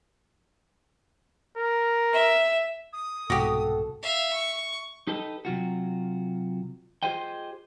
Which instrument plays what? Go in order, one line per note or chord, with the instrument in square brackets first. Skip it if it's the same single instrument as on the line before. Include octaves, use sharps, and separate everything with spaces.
[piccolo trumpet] A#4
[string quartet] E5
[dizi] D#6
[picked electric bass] C2 G#2 B2 [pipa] F#4 G4 [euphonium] A4
[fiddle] E5 F5
C#6
[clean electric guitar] D#4 G4 A4 B4 D#5
C3 F#3 F4 F#4
F4 G4 G#4 C5 D#5 G5